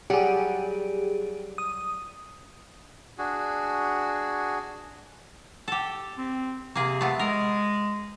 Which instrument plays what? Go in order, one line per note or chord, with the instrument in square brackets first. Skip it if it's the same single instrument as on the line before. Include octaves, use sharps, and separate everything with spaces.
[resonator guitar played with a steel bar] F#3 G3 F#5 [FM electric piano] G4 G#4
[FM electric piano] D#6
[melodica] D4 F#4 G#4
[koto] G4 A4
[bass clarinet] C4
[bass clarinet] C3 [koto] A#3 G#4
[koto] A3 B3
[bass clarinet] G#3 [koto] A#4